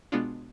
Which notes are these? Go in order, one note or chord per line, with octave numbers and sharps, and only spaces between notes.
B2 G#3 B3 D4 F4